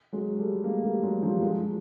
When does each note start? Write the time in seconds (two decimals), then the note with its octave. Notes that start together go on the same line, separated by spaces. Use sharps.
0.13 F#3 G#3
0.39 G3 A3
0.64 G#3 A#3
0.83 G3 A3
1.03 F#3 G#3
1.22 F3 G3
1.42 F#3 G#3